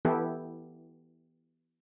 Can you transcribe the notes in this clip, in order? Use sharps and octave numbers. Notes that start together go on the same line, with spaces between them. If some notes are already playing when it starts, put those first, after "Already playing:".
E3 B3 E4 G4 A4